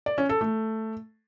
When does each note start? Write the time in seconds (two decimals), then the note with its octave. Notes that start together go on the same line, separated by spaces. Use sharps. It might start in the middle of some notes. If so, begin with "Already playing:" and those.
0.06 D5
0.18 C#4
0.29 A4
0.41 A3